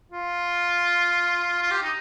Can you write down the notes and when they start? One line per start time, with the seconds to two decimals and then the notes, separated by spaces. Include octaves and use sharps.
0.12 F4
1.63 F4
1.71 G4
1.82 D#4